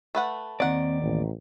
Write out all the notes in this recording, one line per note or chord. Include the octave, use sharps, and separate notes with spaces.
A3 B4 F#5
D#2 D#3 C4 D5 F#5
A1